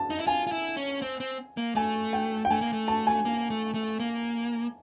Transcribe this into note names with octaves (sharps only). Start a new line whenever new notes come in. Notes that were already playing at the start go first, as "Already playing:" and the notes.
Already playing: A5
D#4
E4
F4 G#5
F4
E4
C#4
C4
C4
A#3
A3 G#5
G5
G5
A3 G#5
A#3
A3
A5
G#5
A#3
A3
A3
A#3